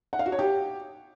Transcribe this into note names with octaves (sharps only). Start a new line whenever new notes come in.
F#5
F5
F#4
C#5
G4